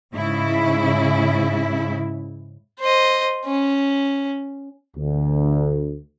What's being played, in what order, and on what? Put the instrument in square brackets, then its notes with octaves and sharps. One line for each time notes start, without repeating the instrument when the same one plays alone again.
[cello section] G#2 C#3 E4
[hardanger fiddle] C5 D#5
C#4
[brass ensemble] D2